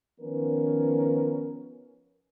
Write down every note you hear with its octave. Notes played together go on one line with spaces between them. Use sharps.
D#3 F3 B3 C#4 A#4 B4